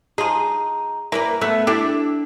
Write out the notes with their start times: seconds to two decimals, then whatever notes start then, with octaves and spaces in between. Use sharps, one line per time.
0.18 F3 D#4 G#4
1.12 E3 A#3 A#4 B4 D5
1.41 A3 B3 E5
1.67 D4 E4 G4 A4